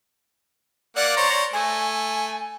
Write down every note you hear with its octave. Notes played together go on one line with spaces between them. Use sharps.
A#3 D5 F#5
C5 C#5 A#5
A3 G#5